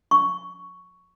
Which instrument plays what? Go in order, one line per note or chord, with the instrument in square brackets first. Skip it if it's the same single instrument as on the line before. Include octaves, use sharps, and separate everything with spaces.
[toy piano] C#6